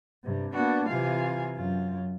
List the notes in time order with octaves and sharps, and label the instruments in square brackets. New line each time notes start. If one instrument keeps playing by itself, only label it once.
[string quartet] G2 C3
A#3 B3 D4 F#4
C3 E3 F4 F5 G#5
F#2 F4